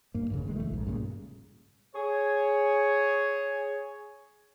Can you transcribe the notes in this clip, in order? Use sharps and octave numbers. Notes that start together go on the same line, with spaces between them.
G2 A#3
E1 D2 C#3
D#3 G#3
E1 F3 A3
A#1 G#2
G2 A#2 C#3
G#4 C#5